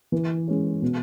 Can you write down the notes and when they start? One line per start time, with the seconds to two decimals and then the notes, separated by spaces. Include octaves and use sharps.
0.12 E3
0.48 G#3 C#4
0.82 B2